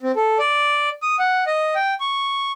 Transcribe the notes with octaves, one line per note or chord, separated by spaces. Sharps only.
C4
A4
D5
D#6
F#5
D#5
G5
C#6